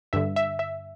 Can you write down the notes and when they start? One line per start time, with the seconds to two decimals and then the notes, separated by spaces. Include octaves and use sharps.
0.13 G2 D3 E5
0.36 E5
0.59 E5